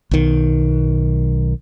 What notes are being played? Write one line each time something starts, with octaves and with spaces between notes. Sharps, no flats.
B1 D#3